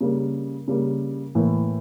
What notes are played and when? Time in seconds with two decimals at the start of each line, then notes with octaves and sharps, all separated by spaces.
0.01 C#3 G3 A#3
0.68 C#3 G3 A#3
1.35 A2 E3 A#3